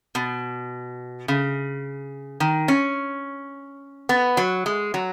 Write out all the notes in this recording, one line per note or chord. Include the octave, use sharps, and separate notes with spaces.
B2
C#3
D#3
C#4
B3
F#3
G#3
F#3